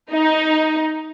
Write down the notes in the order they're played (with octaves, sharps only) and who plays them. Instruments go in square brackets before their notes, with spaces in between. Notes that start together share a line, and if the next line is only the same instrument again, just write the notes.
[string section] D#4